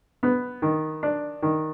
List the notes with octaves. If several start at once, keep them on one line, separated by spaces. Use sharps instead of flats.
B3
D#3
D4
D#3